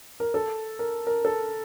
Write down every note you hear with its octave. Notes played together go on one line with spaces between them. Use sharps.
A#4
A4
A#4
A#4
A4